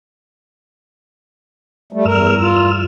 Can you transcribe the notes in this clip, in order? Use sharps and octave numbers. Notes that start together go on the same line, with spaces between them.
G3 A3
E2 G2 A#4 E6 F6
F4